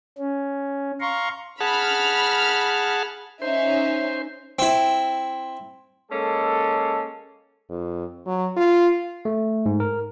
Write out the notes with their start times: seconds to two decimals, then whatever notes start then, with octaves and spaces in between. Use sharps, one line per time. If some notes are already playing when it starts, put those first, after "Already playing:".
0.18 C#4
1.01 F5 A#5 C6 C#6
1.60 G#4 F#5 A5 B5 F6
3.42 C#4 D#4 C5 E5
4.59 C4 E4
6.11 G#3 A#3 C#4 A4
7.70 F2
8.26 F#3
8.57 F4
9.25 A3
9.66 G#2
9.80 A#4